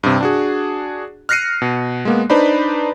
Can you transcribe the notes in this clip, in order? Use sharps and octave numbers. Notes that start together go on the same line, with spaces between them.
G2 C3
D4 F#4 G#4
F6 F#6 A#6 C7 C#7 D#7
B2
G#3 A#3 B3
D4 D#4 B4 C5 D5 B5